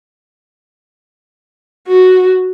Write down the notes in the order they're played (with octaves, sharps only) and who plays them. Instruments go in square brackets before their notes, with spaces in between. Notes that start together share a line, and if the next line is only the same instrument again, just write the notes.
[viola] F#4